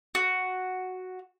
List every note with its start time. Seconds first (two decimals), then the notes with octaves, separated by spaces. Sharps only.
0.15 F#4